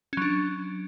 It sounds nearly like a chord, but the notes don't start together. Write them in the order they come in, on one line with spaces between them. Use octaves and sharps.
C#4 F#3 D4